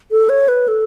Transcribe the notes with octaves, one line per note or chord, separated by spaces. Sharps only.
A4
C#5
B4
A4